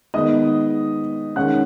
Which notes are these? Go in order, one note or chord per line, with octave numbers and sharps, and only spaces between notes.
D#3 G#3 B3 D#5 D#6
D#3 G#3 C#4 F#5 F#6